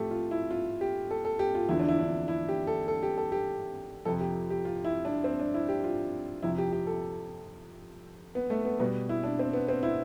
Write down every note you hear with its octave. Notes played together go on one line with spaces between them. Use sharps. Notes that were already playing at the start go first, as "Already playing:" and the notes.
Already playing: A2 F3 A3 G4 A4
F4
E4
F4
G4
A4
A4
G4
F4
E2 D3 F3 E4
D4
E4
D4
E4
G4
A4
A4
G4
A4
G4
F2 C3 F3 A4
G4
G4
F4
E4
D4
C4
D4
E4
G4
F4
F2 C3 F3 E4
G4
G4
A4
B3
A3
B3
B2 G3 B3
E4
D4
C4
B3
C4
E4